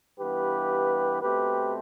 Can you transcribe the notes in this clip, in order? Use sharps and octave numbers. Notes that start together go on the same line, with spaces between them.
G2 E3 B3 G4 B4
B2 A3 C4 G4 B4